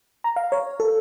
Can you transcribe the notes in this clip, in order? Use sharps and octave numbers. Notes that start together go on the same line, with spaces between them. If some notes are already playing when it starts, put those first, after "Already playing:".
A#5
F5
C#5
A4